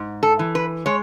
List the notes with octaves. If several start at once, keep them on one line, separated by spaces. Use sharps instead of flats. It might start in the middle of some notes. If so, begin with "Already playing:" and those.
Already playing: G#2
A4
E3
B4
G#3 C#5